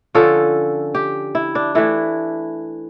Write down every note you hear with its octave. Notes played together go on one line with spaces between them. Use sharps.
D3 F3 C#4 A4
G4
E4
D4
E3 A3 D4 E4